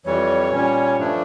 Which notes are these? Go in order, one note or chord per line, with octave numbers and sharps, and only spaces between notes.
F2 E3 G3 C#5
A#2 G3 C#4
G2 F3 A3 D4